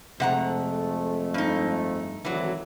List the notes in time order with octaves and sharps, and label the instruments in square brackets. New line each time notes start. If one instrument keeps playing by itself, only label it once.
[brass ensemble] F2 G#3 A3 [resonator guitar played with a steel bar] C3 F#5 A#5
[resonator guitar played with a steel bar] G2 D#4
[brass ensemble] G#1 D2 [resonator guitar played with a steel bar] E3 F#3